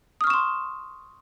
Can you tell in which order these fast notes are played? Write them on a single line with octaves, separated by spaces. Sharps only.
D#6 F6 C#6 E7 C6